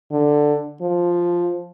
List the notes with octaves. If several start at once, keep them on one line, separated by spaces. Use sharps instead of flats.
D3
F3